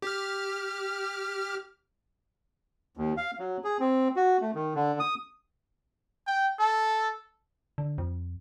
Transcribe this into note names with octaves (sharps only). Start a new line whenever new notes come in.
G4 F6
D#2
F5
F#3
G#4
C4
F#4
A3
D#3
D3
D#6
G5
A4
D3
F2